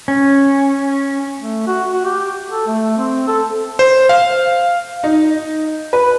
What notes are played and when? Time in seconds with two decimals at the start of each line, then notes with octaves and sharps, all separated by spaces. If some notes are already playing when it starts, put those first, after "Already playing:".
0.08 C#4
1.38 A3
1.67 F#4
1.92 F#4
2.05 G4
2.50 A4
2.67 A3
2.98 C4
3.28 A4
3.79 C5
4.09 F5
5.03 D#4
5.93 B4